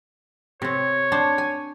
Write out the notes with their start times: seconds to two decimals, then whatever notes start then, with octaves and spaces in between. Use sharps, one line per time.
0.62 C3 C4 C#5
1.12 D4 C5
1.38 G#5